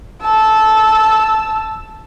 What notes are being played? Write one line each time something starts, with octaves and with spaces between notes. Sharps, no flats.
A5 E6